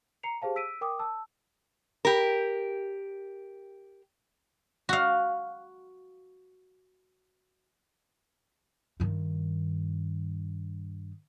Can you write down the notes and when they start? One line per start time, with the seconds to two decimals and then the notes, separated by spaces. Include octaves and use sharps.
0.23 A#5 C7 C#7 F7
0.42 G4 G#4 C5 F5 A5
0.56 E6 B6 D7 D#7
0.81 A#4 G5 D6 D#6
0.99 A5 E6
2.05 G4 A#4
4.89 F#4 F5
9.00 G2 D#3